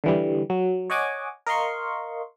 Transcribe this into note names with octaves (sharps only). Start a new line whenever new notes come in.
D3 E3 G3
F#3
C#5 D#5 F#5 G#5 D6
A#4 D#5 F5 C6 C#6